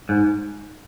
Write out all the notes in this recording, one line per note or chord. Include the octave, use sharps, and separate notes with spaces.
G#2